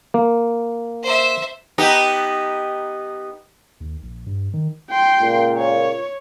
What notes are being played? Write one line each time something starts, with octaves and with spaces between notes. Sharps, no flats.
A#3
C5 E5
B3 D#4 G4
D#2
A#1
G2
D#3
G5 C6
C#2 A#2
C#5